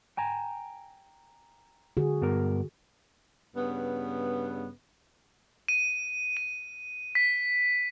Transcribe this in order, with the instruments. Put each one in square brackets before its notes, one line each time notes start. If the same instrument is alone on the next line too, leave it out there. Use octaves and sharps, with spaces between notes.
[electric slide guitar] G5 G#5 A#5
[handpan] D3 F#4 G#4
[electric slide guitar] G2 B3 A#4
[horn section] G2 C#3 B3
[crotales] D#7
D#7
B6